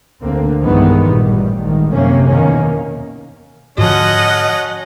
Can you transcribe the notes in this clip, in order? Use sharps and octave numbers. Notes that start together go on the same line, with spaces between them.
D2 D3 A#3 C4
B1 G2 D#3 E3 G#3 B3
A1 A#2 G3
G#1 D#3
F#2 C3 A#3 C#4
E2 B2 D#3 A#3 C#4
G#2 D3 F3 C#4 F#4 D#5 F#5 A5